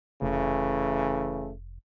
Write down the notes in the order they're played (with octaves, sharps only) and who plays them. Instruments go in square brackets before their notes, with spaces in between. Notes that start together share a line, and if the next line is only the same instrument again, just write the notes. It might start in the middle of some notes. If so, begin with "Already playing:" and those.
[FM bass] F1 [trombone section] C#3 E3 A3